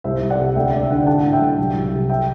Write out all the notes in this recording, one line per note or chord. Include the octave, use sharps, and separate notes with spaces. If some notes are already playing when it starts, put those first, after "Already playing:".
C2 C5 E5
C2
D5 F#5
C3
D2 E5 G5
D2 D5
E5
D3 F#5
G5
A2 F#5 A5
A2
E5 G5
F#3
C2
C2
C3
E5 G5